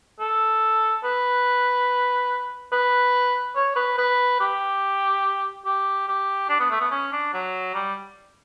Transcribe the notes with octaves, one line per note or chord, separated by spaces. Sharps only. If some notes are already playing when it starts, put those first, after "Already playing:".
A4
B4
B4
C#5
B4
B4
G4
G4
G4
D4
B3
A3
B3
C#4
D4
F#3
G3